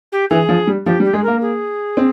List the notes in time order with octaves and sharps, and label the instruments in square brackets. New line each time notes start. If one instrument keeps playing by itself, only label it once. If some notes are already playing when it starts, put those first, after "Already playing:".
[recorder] G4
[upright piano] E3 [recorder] G#4
[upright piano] F3
G3
[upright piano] F3 [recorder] G4
[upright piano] G3
[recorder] G4
[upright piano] G#3 [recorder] G#4
[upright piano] A#3 [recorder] A#4
[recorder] G#4
[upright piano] C4